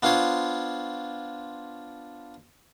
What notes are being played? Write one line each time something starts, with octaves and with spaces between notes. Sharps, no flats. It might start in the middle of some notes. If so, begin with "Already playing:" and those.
B3 D4 F4 C5 C#5